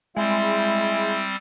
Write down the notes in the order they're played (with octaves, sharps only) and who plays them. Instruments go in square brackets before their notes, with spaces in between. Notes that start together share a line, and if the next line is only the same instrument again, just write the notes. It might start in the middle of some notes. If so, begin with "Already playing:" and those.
[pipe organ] G3 C4 [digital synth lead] G#3 [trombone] E4